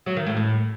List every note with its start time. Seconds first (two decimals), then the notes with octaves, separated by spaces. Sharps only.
0.06 F#3
0.16 D#3
0.27 A2
0.37 A2